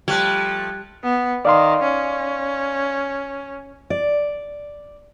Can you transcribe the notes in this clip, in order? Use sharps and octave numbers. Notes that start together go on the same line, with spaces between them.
F3 G3 A3 F#6 G#6
B3
D#3 D5 F5 C6
C#4
D5